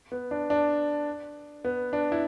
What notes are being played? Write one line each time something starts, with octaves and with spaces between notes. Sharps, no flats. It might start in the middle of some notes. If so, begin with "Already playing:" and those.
B3
D4
D4
B3
D4
E4